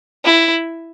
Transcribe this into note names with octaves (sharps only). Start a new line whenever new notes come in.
E4